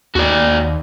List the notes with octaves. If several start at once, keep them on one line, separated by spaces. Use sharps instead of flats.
D#2 F#4 D5